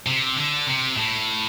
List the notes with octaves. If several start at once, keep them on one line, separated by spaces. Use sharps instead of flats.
C3
D3
C3
A2